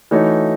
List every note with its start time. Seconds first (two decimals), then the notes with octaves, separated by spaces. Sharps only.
0.11 E3 A3 D#4 F#4 C#5